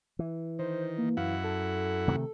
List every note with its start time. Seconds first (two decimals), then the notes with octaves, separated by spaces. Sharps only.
0.19 E3
0.59 D#3 C5
0.98 A#3
1.17 F#2 E4 F5 F#5
1.44 A4
2.08 C3 D#3 A3